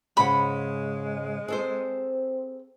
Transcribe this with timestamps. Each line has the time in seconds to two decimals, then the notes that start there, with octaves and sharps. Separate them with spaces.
0.17 G#2 C#3 G#3 F#5 B5
1.48 C4 G#4 A4 C5